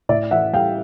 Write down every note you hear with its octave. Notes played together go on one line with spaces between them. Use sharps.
A2 D5 E5
E3 E5 F#5
G3 F5 G5